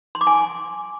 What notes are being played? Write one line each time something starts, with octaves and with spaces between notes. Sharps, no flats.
C6
D6
G#5